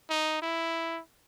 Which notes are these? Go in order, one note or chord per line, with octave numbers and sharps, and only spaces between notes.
D#4
E4